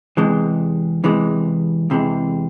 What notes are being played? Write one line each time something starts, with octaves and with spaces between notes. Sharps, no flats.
E2 C3 E3 G#3
E2 C3 E3 G#3
E2 C3 E3 G#3